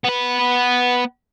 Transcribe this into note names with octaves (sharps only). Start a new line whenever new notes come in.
B3 B4